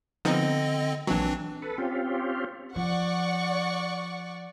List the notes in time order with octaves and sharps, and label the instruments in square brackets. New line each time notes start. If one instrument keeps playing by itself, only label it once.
[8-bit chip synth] D3 C4 D#5 [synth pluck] F3 B3 D#4
[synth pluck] A#1 F#3 [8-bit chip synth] E3 C4 D4
[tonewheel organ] A4 B4
C4 C#4 F4 G4
[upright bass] F3 [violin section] D5 F#5 C#6